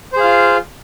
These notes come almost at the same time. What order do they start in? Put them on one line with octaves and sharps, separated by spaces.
C5 G#4 F5 F4